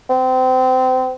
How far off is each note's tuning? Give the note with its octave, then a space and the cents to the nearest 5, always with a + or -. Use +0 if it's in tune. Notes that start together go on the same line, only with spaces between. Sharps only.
C4 -30